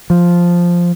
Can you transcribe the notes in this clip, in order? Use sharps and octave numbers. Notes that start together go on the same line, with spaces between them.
F3